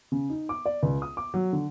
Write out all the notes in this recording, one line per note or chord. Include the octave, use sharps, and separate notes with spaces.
C#3
D#4
D6
D5
C#2
D#6
D6
F#3
D3